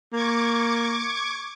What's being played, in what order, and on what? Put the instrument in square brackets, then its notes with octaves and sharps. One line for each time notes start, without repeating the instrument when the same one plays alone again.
[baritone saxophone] A#3 [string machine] C#6 D6 G#6